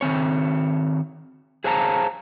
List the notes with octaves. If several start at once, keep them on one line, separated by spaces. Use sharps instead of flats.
D#3 C4 C#5
G#4 C5 C#5 F5 A5 A#5